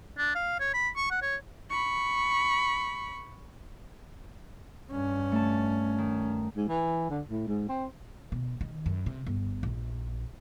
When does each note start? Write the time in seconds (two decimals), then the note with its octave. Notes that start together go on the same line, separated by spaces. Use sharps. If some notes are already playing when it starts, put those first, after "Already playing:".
0.18 D4
0.35 F5
0.60 C#5
0.74 B5
0.96 C#6
1.11 F#5
1.22 C#5
1.70 B5 C#6
4.91 G2 C#4
5.32 A3 A5
5.98 D#3
6.56 G#2
6.68 E3
7.10 D3
7.29 A2
7.48 G#2
7.69 C4
8.32 B2
8.61 D#3
8.86 F#2
9.06 C3
9.27 G1
9.63 A#1